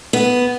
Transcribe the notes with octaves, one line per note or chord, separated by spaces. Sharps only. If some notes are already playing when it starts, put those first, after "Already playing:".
B3